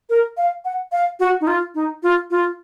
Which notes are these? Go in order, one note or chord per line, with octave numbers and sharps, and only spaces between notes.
A#4
F5
F#5
F5
F#4
D#4
F4
D#4
F4
F4